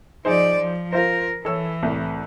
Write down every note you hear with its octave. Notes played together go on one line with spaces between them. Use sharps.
F3 D#4 G#4 C5 D5
F3
F4 A#4 C5
E3 A4 C#5 E6
C2 A2